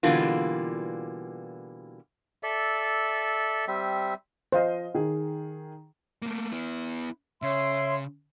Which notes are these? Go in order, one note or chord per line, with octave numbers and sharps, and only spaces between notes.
B2 D3 E3 G3 A#3 F4
A4 D5 E5
G3 C4 E5
F3 C5 D#5 F5
D#3 G#4
A3 A#3
B3 E4
C#3 C#5 E5 C6